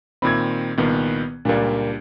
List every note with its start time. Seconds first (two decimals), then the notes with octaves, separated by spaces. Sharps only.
0.22 A#2 D#3 C4 B5 G#6
0.78 C2 A#2 D#3 B3
1.45 C#2 A#2 G3 A#3 D4